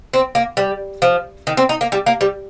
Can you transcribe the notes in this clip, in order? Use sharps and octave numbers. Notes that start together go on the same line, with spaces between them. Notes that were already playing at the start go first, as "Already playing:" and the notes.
C4
A#3
G3
F3
D#3
C4
D#4
A#3
G3
A#3
G3